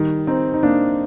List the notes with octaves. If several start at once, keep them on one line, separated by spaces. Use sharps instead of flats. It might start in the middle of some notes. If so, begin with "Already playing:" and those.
Already playing: D#3 G3
C4 D#4
D#4
A#3 D4